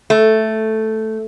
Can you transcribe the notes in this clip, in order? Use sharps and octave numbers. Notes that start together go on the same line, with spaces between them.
A3